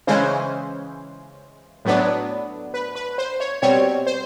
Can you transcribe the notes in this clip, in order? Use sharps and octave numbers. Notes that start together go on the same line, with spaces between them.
C#3 E3 G#3 C#4 C5
A2 F#3 B3 D4
B4
B4
C5
C#5
B2 G3 C4 C#5
C5